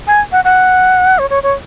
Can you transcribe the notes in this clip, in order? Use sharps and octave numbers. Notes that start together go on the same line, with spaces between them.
G#5
F#5
F#5
C#5
C#5
C#5